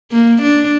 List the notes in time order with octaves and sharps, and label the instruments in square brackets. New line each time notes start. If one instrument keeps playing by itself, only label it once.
[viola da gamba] A#3
D4